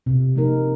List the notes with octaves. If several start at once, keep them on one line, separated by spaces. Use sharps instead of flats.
C3
F3 A#3 D#4 A#4